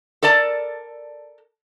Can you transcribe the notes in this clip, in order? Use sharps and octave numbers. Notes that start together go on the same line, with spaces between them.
A4 A#4 D5 A5